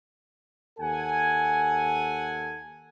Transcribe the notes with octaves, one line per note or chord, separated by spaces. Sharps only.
D#2 A4 F#5 G#5